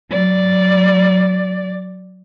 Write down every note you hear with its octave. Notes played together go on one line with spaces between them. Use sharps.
F#3 D5